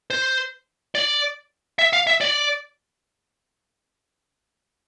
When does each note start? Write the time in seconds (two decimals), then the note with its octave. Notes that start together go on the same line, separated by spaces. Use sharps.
0.10 C5
0.95 D5
1.79 E5
1.93 F5
2.07 E5
2.21 D5